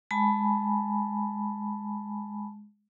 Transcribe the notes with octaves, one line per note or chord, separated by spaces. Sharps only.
G#3 G#5 A5 B5